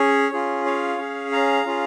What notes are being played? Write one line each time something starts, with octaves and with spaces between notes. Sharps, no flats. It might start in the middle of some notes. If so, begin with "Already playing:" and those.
Already playing: C#4 G#4 C#5
C#4 F4 G#4
C#5 F5
C#4 G#4
F5 A#5
C#4 F4 G#4